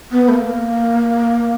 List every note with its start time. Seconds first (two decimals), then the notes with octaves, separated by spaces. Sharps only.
0.11 B3
0.29 A3
0.34 A#3